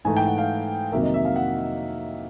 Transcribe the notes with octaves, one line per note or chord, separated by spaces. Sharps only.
G#2 E3 A3 G#5
G5
F#5
F5
F2 C3 D#3 F#3 A#3 E5
D#5
E5
F5
F#5